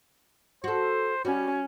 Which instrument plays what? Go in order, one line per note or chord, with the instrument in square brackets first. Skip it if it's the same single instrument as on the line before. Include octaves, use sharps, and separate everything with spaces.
[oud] F#4 A4 [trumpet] C5
[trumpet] G3 [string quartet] C#4 [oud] F#4